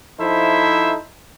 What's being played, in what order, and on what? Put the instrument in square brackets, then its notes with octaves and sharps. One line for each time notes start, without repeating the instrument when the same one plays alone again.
[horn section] F3 D#4 E4 A4 C5 E5